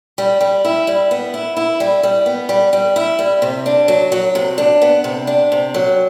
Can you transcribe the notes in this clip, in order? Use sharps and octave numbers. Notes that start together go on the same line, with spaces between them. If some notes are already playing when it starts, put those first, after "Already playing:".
G3
G3
E4
G3
B3
E4
E4
G3
G3
B3
G3
G3
E4
G3
C3
D4
F#3
F#3
C3
D4
B3
C3
D4
C3
F#3